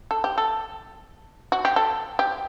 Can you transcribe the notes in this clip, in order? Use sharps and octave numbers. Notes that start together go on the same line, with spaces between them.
A4
G4
A4
F#4
G4
A4
G4